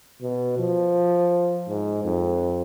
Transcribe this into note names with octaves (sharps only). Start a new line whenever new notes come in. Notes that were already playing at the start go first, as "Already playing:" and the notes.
B2
F3
G#2
F2